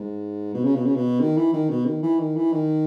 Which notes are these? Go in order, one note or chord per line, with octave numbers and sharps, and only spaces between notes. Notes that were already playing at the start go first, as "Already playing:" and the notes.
Already playing: G#2
B2
C#3
B2
C#3
B2
D#3
E3
D#3
B2
D#3
E3
D#3
E3
D#3